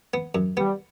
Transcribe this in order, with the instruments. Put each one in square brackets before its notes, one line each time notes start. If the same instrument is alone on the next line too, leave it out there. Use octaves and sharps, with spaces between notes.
[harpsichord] B3
F#2
[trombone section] G3 [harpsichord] B3